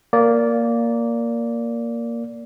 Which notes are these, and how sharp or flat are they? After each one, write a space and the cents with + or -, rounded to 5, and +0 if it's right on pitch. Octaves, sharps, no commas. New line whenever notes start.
A#3 +0 D5 -15